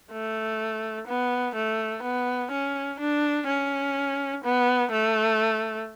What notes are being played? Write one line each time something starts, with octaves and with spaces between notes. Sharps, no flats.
A3
B3
A3
B3
C#4
D4
C#4
B3
A3